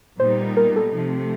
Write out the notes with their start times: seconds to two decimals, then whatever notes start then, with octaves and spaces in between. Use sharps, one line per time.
0.20 A#2 G3 B3 D#4 C5
0.57 A#4
0.76 A4
0.94 C3 F3 A3